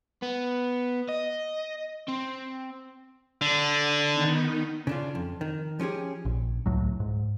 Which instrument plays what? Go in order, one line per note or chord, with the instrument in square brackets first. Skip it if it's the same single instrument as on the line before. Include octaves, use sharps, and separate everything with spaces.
[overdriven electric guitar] B3
D#5
C4
[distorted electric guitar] D3
[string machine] D#3 B3 D#4
[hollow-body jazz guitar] C#3 D4 F4
F2
D#3
F3 C#4 G4 G#4
[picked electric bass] A#1
C#2 A2 F#3
G#2